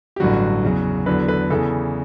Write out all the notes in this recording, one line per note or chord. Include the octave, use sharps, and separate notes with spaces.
G4
A1 G2 D3 F#3 F#4
E2 C#3 F#3
E2 D3 F#3 B4
A4
B4
E2 C#3 E3 A4